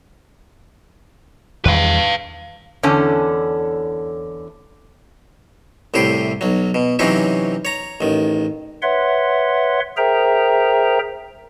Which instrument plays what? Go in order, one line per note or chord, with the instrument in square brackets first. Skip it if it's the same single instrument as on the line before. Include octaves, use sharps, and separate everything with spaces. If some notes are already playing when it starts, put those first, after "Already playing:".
[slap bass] E2 D#3 G3 [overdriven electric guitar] B4 F5
[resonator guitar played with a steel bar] E2 D3 C#4 A4
[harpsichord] C2 A2 C3 E4 G5 C6
B1 F#3
B2
C3 E3 F#3 C4 C#4 D#4
C#5 A#5
A1 D#3
[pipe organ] B4 C#5 E5 F#5 C6
G#4 A#4 C5 E5 G5 A#5